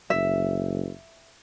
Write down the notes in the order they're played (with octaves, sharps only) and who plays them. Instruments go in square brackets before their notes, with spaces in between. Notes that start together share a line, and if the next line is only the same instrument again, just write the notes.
[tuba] F#1 [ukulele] E5